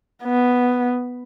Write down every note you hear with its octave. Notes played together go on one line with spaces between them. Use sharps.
B3